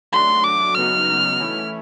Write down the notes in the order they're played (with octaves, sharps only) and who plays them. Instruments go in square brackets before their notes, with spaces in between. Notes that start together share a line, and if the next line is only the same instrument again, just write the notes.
[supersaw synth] F#3 A3 D4 F#4 [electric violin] C6
[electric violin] D6
[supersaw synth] C#3 F#3 B3 D#4 F#4 [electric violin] F6
[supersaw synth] E3 A3 C#4 E4